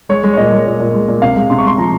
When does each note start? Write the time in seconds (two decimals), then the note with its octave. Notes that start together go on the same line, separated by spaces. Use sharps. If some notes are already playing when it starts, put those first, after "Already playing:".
0.09 G#3 C#5
0.24 G#3
0.34 C#5
0.37 A#2 D#5
0.52 G#3
0.66 A#2
0.80 A#2
0.94 G#3
1.08 A#2
1.22 C3 F5
1.36 G#3
1.50 C3 C6
1.58 C#6
1.64 G#3 C6
1.78 F3 A#5